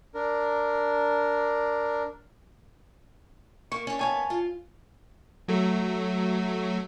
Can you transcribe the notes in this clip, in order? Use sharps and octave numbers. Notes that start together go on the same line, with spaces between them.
D4 A#4
A#3 C#6
C#4 D4
D#2 B3 C#5 F5 G#5 A5
F4
F#3 A3